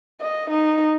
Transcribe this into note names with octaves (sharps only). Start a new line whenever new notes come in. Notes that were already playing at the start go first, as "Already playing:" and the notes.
D#5
D#4